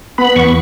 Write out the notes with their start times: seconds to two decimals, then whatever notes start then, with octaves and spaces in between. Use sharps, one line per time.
0.18 B3 B5
0.36 E2 C#6